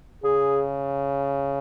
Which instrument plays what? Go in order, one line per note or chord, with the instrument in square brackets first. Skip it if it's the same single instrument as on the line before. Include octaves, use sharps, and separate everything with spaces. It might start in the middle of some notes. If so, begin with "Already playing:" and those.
[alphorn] C#3 [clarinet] G#4